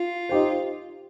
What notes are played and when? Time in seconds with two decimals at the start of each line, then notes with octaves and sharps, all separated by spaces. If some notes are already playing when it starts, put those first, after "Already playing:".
Already playing: F4
0.29 D#4 G4 C5